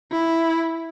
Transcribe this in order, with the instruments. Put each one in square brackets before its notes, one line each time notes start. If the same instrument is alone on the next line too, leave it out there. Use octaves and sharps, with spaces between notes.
[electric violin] E4